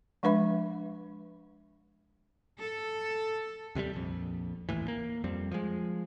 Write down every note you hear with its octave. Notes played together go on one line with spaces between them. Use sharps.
F3 G#3 D4 B4 E5 B5
A4
D#2 C3 F3 G3
A#1 F2
A1 D#2 A2 E3
A#3
F2 G3 C4
F3 G#3